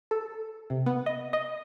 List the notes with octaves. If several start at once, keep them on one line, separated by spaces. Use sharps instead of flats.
A4
C3
B3
D#5
D#5